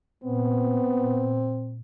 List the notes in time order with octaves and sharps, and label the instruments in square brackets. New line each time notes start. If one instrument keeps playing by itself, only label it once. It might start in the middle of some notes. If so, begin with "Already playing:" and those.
[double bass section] A#2 [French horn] B3 [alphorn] C4